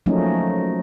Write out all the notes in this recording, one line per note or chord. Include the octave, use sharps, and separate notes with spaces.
F3 F#3 A3 A#3 C#4 D#4